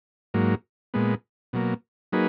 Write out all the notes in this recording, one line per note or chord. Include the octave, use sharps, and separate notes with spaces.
G#2 F#3 A#3
A#2 G#3 B3
B2 F#3 A#3
F#3 A#3 D#4 G#4 B4